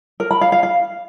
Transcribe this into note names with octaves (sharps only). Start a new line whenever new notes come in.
A#4
B5
F5
F5
F5